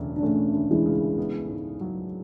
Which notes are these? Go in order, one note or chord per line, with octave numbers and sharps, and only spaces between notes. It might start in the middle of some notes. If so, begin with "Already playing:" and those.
Already playing: E1 D2 C#3 D4
D4
E1 A3 C#4
D2
E3 G#3
C#3
B3
G#2
F#3